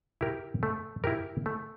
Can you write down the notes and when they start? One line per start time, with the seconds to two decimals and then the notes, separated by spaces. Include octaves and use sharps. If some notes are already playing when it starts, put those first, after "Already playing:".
0.21 E4 G4 A#4
0.63 A3
1.04 E4 G4 A#4
1.46 A3